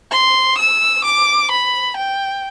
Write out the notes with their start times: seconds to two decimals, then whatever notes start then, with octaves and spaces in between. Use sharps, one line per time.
0.12 C6
0.58 E6
1.04 D6
1.51 B5
1.97 G5